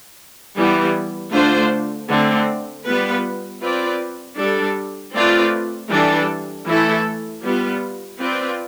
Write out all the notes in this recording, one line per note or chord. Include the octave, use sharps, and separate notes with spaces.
E3 G3 B3
D3 A3 D4 F4 C5
D3 A3 C4
G3 B3 F4 B4
C4 F4 B4 D5
G3 D4 A4
A3 C4 F4 B4 D5
E3 G3 D4 A4
E3 A3 E4 A4
G3 B3 F4
C4 F4 B4 D5